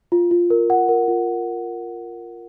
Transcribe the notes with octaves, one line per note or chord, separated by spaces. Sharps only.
F4
F4
A#4
F#5
A#4
F4